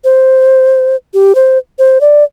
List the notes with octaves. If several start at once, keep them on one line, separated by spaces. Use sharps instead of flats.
C5
G4
C5
C5
D5